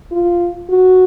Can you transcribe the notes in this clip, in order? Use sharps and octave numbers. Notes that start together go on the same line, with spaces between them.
F4
F#4